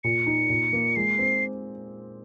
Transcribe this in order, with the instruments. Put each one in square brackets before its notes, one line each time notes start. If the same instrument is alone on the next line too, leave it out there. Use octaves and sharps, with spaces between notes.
[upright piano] A#2 [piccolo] C#7
[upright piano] D#4
A#2
A#3
[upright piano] G#3 [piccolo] C7
[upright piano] C4